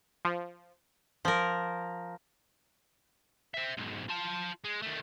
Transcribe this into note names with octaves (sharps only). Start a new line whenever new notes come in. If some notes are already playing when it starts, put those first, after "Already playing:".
F3
F3 A#4
C5 E5
B1 G#2
F4 A5
G#3
D#3 A3